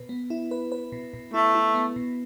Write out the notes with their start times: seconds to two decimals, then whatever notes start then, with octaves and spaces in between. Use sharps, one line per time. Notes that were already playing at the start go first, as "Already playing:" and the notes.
Already playing: B2 B4
0.09 B3
0.30 E4
0.51 B4
0.72 B4
0.92 B2
1.13 B2
1.34 A3 E4
1.55 E4
1.75 B3
1.96 B2